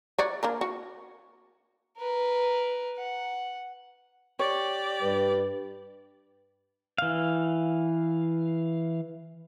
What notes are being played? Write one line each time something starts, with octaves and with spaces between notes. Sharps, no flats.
C#5 D5 F#5
A#3 D4 A#4
F#4
A#4 B4
F#5
G4 C#5 D5
G2 G3 B4
E3 F5